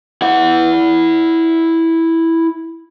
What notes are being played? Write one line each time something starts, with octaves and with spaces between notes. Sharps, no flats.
E4 F#5